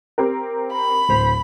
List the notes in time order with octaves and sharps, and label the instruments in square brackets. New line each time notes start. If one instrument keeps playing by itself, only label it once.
[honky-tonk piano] C4 G4 A#4
[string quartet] B5
[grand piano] D1 C5 F7